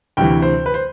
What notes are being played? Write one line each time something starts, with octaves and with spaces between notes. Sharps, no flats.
D2 C3 E3 G5
C5
B4
C5